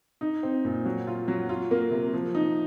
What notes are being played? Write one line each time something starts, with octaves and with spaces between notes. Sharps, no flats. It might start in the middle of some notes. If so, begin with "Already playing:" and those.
D#4
C4
A#2
F#3
F4
F#3
F4
A#3
C3
F3
D#4